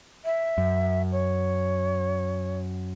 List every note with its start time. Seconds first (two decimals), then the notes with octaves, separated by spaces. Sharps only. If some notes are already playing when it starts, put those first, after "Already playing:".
0.25 E5
0.58 F#2
1.12 C#5